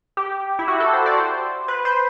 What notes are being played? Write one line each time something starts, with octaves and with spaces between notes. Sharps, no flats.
G4
E4
F#4
A4
C5
D5
C5
B4
C5